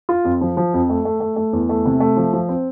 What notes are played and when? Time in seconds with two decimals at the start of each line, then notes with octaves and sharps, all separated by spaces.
0.09 F4
0.25 F2
0.41 F3
0.57 F3
0.74 F2
0.90 A3
1.05 A3
1.20 A3
1.36 A3
1.53 E2
1.69 A3
1.85 C3
2.00 A3
2.17 F3
2.33 F3
2.49 C4